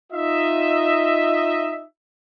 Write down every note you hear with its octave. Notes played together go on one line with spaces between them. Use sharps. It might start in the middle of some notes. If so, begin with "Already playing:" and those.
D#4 F4 D#5 E5